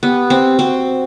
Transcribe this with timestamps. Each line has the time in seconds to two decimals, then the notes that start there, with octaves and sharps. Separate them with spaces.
0.03 B3 G4
0.30 C4
0.59 C4 F#4